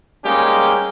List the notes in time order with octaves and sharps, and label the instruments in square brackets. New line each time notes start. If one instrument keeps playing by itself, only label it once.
[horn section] G3 G#3 A#3 C#4 D#4 G4